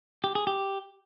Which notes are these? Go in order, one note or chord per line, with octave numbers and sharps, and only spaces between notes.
G4
G#4
G4